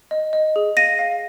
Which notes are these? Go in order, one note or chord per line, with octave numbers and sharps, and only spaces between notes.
D#5
D#5
G#4
F5 A#6 D#7
F5